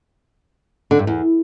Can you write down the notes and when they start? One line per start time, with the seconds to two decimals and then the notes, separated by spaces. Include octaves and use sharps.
0.91 D3
0.99 G2
1.07 E2